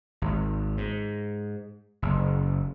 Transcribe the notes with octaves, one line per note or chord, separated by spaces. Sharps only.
G#1
G#2
F#1